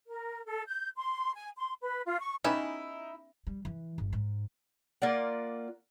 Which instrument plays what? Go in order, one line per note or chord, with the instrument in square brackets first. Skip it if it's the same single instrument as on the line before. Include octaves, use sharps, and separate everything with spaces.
[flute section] A#4
A4
G6
C6
G#5
C6
B4
F4
C#6
[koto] B3 C#4 G4 [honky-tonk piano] D#4 [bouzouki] E4 [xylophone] G#5 B5
[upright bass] G3
E3
G1
G#2
[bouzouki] A#3 F4 D5 F#5